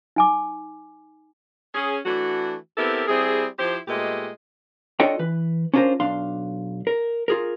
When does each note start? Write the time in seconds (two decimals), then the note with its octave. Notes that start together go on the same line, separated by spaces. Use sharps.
0.16 D#4 G#5 D6
1.74 C#4 G#4
2.06 E3 A3 D4 F#4
2.78 B3 C4 E4 G4 A4 A#4
3.08 G3 C4 E4 G#4
3.59 F3 E4 G4 C5
3.88 A#2 G#3 A3 B3 G4 D#5
5.00 D4 F4 A4 C#5 D#5 G5
5.19 E3 B4
5.74 C#4 D4 F4 A4 A#4 C5
6.00 B1 D4 F5 C6
6.87 A#4
7.28 F4 G#4 A#4